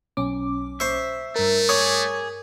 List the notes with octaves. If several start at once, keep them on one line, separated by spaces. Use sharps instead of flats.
B1 C#4 D6
C5 E5 C#6
G2 A3 A#4
G#4 C#5 D6 D#6